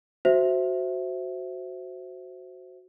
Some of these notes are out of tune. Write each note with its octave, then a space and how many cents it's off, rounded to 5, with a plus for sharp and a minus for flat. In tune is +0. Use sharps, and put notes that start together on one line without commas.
F#4 +0 C5 +0 E5 +0